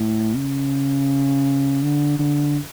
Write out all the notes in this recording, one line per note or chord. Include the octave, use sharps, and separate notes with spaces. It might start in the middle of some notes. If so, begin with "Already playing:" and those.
Already playing: A2
C#3
D3
D3